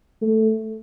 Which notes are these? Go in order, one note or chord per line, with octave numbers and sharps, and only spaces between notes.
A3